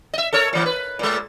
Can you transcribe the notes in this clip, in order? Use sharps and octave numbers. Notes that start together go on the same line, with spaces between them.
D#5 E5
A4 A#4 C#5
A#2 E3
B4
A#2 G#3